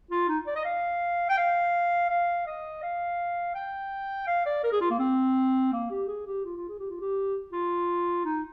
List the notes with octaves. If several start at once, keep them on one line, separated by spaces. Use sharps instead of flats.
F4
D#4
D5
D#5
F5
G5
F5
F5
D#5
F5
G5
F5
D5
A#4
G#4
F4
A#3
C4
A#3
G4
G#4
G4
F4
F4
G#4
G4
F4
G4
F4
D#4